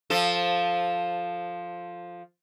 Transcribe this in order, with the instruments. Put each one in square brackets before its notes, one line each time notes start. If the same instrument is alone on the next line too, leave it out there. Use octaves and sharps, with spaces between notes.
[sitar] F3 A4